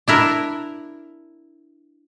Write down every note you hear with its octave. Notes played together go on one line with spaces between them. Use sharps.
D4 E4 A#4